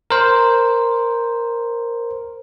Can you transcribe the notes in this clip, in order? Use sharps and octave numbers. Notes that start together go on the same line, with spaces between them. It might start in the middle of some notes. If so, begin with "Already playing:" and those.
A#4 C5